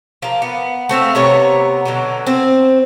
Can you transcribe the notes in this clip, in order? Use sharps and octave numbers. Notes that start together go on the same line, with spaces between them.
F3 A#3
B3
A3 C4 E5 F5
C3 B3 C#5 A#5
B2 D3 F#3
C4 C5